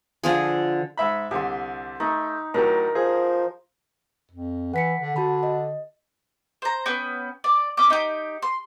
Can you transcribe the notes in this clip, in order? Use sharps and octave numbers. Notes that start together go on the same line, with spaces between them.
D3 F3 G#4
G#2 E5 B5
C2 D3 G4 C6
A3 D#4
A2 F#3 G4 A#4
F3 G#4
F2
E3 F#5 B6 C#7
D3
D3 F#4 A5 B5
D#5
C5 A#5
B3 C#4 G5
D5
C#4 D6
D#4 G4
C6